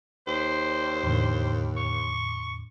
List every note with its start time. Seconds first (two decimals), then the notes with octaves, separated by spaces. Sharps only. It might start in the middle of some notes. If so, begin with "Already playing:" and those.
0.27 D#2 C5
1.04 E2 A2 D3
1.77 C#6